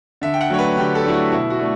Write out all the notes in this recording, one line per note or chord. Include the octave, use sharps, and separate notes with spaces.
D3 E5
G5
F#5
F#3 A3 D4 C#5
B4
D3 G4
A4
F#3 A3 D4 E4
F#4
B2 E4
F#4
A3 D4